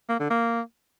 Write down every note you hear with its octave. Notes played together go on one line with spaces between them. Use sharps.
A#3
D3
A#3